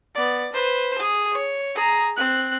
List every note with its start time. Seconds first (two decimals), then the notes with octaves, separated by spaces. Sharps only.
0.15 B3 D5
0.53 B4 C5
0.98 G#4
1.31 C#5
1.75 G#4 A#5
2.17 C4 F#6